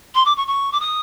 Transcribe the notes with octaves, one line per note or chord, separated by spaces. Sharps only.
C6
D6
C#6
C#6
D6
D#6